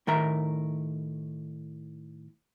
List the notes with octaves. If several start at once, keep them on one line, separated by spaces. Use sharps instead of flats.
A2 D#3 A#4 E5 A#5